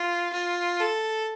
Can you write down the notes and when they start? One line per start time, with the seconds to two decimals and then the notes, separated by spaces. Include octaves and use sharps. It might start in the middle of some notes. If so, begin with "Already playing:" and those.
Already playing: F4
0.33 F4
0.80 A4